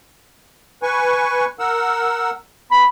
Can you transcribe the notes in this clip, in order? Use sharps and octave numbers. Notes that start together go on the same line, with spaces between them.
B4 G#5 C#6
A#4 F#5 E6
B3 B5